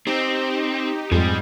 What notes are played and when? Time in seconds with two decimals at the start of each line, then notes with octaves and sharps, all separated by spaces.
0.07 C4 D#4 G4
1.12 F2 G#2 G3 G#3 G#4